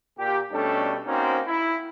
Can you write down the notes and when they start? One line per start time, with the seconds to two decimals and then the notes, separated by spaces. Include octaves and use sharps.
0.18 A#2 G4
0.51 B2 G3 A3 C#4 D4 A4
1.06 A#3 C4 C#4 D#4 F#4 C5
1.46 E4